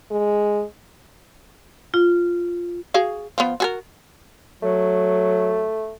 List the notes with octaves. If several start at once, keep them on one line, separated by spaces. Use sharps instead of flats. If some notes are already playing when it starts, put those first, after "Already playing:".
G#3
F4
F#4 G#4 F5
F3 B3
F#4 G#4 A#4
F#3 A3